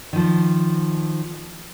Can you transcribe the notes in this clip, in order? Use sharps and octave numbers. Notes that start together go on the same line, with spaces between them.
D#3 F3